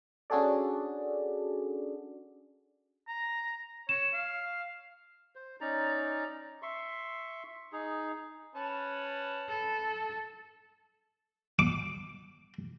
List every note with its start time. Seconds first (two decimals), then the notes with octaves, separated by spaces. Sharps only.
0.30 C#4 D4 F#4 G#4 A4 D5
3.08 A#5
3.89 C#5 E7
4.13 F5
5.35 C5
5.61 C#4 D#4 D5 A#5
6.62 E5 C6 C#6
7.72 D#4 G#4
8.56 C#4 B4 A5
9.49 A4
11.59 D6